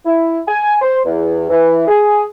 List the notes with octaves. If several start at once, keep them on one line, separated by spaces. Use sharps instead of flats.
E4
G#5
C5
E2
E3
G#4